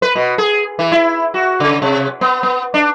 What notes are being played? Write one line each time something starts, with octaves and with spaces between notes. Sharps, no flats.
B4
B2
G#4
E3
E4
F#4
C#3
C3
B3
B3
D4